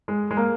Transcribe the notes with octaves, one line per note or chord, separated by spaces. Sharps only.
G#3
G#3
A#3